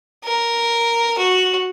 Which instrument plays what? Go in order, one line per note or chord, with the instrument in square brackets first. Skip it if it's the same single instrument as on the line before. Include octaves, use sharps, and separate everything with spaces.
[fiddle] A#4
F#4